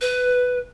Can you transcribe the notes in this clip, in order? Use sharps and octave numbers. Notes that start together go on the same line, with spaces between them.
B4